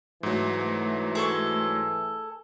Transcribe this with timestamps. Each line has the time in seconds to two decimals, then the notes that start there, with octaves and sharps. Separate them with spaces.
0.23 G#2 E3 F#3 A3
1.15 G#4 A4 C#6